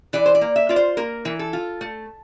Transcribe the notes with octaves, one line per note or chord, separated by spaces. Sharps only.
E3 D5
C5
D5
A#3
E5
F4 D5
C5
A#3 A#4
E3
A4
F4
A3